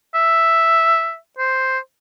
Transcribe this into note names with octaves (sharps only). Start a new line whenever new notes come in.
E5
C5